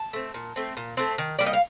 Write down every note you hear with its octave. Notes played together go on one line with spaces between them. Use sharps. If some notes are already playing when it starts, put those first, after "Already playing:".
Already playing: A5
A3 C4
A#2
A3 C4
A#2
A3 C4
D#3
G3 A#3 D5
D#5
F5